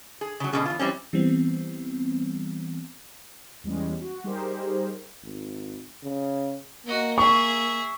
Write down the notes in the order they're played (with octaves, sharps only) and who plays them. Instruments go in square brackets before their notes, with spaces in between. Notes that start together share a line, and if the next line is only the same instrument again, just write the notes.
[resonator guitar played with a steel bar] G#4
C#3 F#3
B2 D3 F3 G#3 C#4 G#4
E2 F4
E3 G3 C4 C#4
[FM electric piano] E3 G3 B3 C4
[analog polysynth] E2 G3 G#3 C#4
F#4
G3 D#4 G4 G#4 A#4 C5
[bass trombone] G#1
C#3
[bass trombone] A#3 [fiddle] F#4 D#5
[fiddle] G#4 E5 [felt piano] C#6